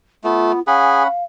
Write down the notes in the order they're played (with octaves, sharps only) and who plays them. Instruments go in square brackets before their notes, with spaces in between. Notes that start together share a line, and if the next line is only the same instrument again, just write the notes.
[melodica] A3 [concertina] B3 [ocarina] F4
[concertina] C#4 F#5 B5 [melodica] G#4 [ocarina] F5